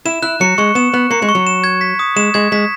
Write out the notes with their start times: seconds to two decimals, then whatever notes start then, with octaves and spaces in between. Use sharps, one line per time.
0.05 E4 E7
0.23 E4 F#6
0.41 F#3 C#7
0.58 G#3 C#6
0.75 B3 E7
0.94 B3 F#6
1.10 A#3 C#7
1.22 G#3
1.29 C#6
1.35 F#3
1.47 E7
1.64 G#6
1.81 B6
1.99 D#6
2.16 G#3 E7
2.34 G#3 G#6
2.52 G#3 B6